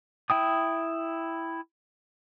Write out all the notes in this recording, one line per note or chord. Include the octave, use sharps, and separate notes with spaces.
E4 G5 D#6